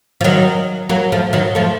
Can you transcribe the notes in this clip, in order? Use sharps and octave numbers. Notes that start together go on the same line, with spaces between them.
F3
D#3 F#3
F#3 A#3
F3 A3
D#3 F#3
F3 A3